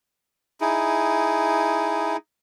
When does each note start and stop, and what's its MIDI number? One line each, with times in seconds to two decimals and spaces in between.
0.61 2.17 63
0.61 2.17 64
0.61 2.17 68